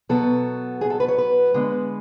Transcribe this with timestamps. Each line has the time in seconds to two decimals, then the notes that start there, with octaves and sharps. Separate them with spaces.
0.09 B2 F#3 B3 A4
0.81 G#4
0.90 A4
1.00 B4
1.08 C#5
1.18 B4
1.54 D3 G#3 B3